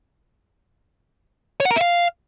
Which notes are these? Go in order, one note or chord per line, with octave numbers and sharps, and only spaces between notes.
C#5
F#5
A#4
E5
F5